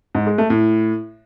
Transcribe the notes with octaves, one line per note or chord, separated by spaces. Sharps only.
G#2
G#3
A3
A2